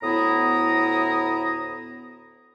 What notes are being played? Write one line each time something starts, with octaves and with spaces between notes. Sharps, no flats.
D2 A2 B3 E4 A#5 D#6